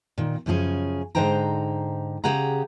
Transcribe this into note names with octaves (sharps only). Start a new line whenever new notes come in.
A#2 D#3
F#2 C#3 F3 C#4 G#4
G#2 D3 D#4 C5 G5 A#5
C#3 G4 G#4 F#5 A#5